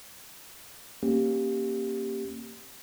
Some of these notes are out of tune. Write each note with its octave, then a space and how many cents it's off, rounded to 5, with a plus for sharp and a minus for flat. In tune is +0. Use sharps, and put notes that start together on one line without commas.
A#3 +0 C#4 -30 G4 +0